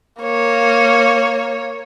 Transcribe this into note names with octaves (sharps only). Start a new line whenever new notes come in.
A#3 C#5